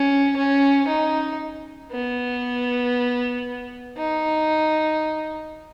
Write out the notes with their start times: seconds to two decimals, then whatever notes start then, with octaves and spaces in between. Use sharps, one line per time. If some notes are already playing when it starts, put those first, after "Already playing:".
Already playing: C#4
0.37 C#4
0.88 D#4
1.92 B3
3.97 D#4